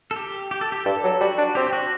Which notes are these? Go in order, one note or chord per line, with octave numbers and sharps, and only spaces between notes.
A4
G4
G4
A4
G4
G2 A4
F#3
G3 F#4
D4
C4 G4
G4
F#4